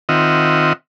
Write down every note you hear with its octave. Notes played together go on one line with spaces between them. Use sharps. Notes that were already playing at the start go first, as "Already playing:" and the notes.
D#3 C4 F4 D#5 E5 F#5